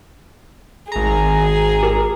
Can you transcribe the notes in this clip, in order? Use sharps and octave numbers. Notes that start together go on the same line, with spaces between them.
G#1 G#4 A#5
G4 A#4